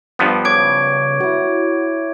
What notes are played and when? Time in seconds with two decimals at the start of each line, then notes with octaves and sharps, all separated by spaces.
0.19 G2 F3 B3
0.45 C#3 C#5 D6 G#6 D7
1.20 E4 F#4 F#5